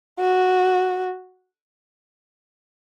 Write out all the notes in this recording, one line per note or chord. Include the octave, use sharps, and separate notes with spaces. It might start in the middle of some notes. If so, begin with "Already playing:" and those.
F#4